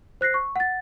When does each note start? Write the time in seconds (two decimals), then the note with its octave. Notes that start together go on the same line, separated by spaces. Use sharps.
0.21 C5 F#6 A#6 C7
0.34 C#6
0.56 F#5 A6